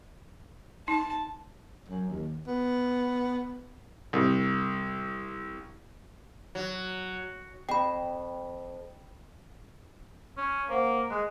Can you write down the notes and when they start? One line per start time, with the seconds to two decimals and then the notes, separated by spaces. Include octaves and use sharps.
0.88 D#4 A5
1.88 F#2
2.09 D#2
2.47 B3
4.13 C2
6.55 F#3
7.69 F2 G5 B5
10.37 C#4
10.69 A#3 C5 F#5
11.10 G#3 F#6